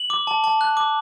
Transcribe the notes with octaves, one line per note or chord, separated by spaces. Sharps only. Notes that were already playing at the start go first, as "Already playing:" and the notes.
Already playing: F#7
D6
A5
A5
F#6
D6